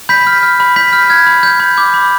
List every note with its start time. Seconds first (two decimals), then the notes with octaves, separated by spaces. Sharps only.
0.09 B5 G6 B6
0.27 F6
0.43 F6
0.60 B5
0.76 B5 G6 B6
0.93 F6
1.10 F6 G#6
1.27 B5
1.43 F6 G6
1.60 B5
1.77 D6 G6
1.94 B5